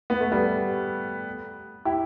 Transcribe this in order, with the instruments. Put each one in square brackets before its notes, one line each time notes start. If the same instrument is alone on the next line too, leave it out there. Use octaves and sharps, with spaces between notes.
[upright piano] B3
A3
G3 B3
E4 G4